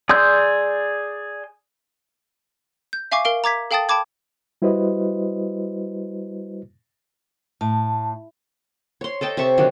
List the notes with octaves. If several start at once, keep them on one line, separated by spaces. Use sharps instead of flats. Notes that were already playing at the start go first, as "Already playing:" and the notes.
G#4 D5 C6 E6 G6
G6
E5 F5 G#5 C#6 D6 C7
A#4 F5 D7
A#5 D6 G#6 B6
A4 F5 G5 A5 D#6 A6
G5 A5 B5 D6 G#6
G3 E4 F#4 B4 C5 D#5
A2 A5
C#5 C6
A4 D#5 G5 A5
C3 E5 A5 C#6
D3 D#3 F#3